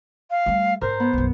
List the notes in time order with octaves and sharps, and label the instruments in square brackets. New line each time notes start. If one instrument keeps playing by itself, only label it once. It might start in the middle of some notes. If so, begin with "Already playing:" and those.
[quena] F5
[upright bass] G3 A3
[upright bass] G#2 [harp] A#4 [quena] C5
[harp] B3
[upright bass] B1 F#2